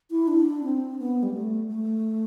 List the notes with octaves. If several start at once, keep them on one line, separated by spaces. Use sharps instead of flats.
E4
D4
C4
B3
G3
A3
A3